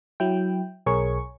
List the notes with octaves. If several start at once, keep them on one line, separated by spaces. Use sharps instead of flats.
F#3 E4 G5
B1 G#4 A#4 C#5 C#6